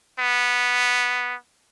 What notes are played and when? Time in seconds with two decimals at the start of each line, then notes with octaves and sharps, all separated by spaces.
0.19 B3